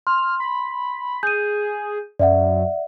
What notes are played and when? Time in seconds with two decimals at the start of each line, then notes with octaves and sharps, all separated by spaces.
0.07 C6 F6
0.40 B5
1.23 G#4 G6 D#7
2.19 F#2 D5 E5 F#5